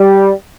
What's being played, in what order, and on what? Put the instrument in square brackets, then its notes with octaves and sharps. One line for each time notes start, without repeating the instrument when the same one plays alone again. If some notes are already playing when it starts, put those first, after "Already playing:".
Already playing: [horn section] G3